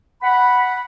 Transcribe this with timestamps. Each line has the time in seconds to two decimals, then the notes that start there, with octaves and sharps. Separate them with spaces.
0.22 F#5 B5